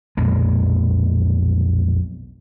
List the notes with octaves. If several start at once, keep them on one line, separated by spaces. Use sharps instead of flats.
B1 F2 A#2 G#3